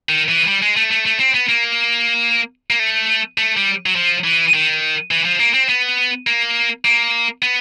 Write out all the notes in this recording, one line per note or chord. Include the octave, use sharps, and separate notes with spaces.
D#3
E3
G3
G#3
A3
A3
A3
C4
B3
A#3
A#3
A3
A3
G3
F#3
F3
E3
D#3
E3
F3
A#3
C4
B3
A#3
A#3
B3